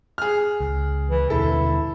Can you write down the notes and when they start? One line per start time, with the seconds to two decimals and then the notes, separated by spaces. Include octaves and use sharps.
0.18 G#4 F6
0.60 C#2
1.08 E3
1.30 D#2 B2 D3 E4 A4